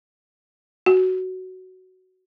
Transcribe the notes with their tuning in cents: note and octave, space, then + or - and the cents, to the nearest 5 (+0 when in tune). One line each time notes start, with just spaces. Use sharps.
F#4 +10